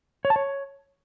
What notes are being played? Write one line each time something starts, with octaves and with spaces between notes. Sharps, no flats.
C#5
A5
C#5